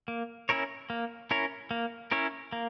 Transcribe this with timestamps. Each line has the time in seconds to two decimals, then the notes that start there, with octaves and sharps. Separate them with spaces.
0.08 A#3
0.49 C#4 E4 A#4 C#5
0.90 A#3
1.31 C#4 E4 A#4 C#5
1.71 A#3
2.11 C#4 E4 A#4 C#5
2.53 A#3